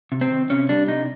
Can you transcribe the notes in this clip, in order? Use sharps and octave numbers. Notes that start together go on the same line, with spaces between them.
C3
C4
D#3
C3 C#4
G3 D4
C3 D#4